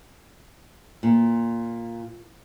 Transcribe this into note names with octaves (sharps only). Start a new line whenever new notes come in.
A#2